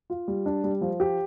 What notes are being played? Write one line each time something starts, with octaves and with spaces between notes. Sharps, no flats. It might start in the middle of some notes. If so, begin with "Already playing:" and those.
F4
G3
D4
G3
F3
G4